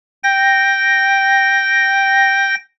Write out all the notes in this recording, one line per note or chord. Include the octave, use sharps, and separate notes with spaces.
G5 A#6